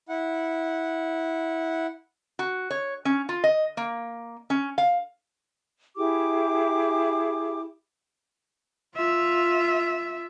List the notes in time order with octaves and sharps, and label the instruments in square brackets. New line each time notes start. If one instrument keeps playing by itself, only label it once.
[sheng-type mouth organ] E4 F#5
[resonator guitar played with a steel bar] F#4
C#5
C#4
F4
D#5
A#3
C#4
F5
[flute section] E4 G4 G#4 D6
[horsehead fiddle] F4 E5